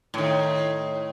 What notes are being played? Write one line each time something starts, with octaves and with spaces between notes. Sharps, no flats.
A2 D#3